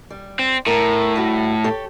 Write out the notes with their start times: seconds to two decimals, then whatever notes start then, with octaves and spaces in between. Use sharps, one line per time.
0.10 G3
0.39 C4
0.67 A2 A#4
1.16 G3 E4 F#4
1.64 G4 A4 C#5